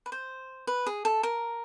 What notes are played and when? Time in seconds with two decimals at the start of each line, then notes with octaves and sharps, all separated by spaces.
0.06 B4
0.12 C5
0.67 B4
0.87 G#4
1.05 A4
1.23 A#4